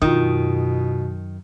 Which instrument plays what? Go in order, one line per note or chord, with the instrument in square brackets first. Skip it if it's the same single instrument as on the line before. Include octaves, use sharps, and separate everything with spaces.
[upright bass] F#2 [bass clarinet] B2 [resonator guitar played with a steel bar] D#3 [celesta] F4 D#6